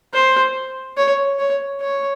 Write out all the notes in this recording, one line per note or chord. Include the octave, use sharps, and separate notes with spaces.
C5
C#5
C#5
C#5